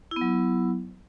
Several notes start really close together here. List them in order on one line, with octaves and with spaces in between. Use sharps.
E4 B3 F#3